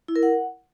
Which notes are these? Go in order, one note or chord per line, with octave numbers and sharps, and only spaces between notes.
E4
A#4
F#5